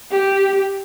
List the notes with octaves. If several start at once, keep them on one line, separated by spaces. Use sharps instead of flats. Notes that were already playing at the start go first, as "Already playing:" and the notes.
G4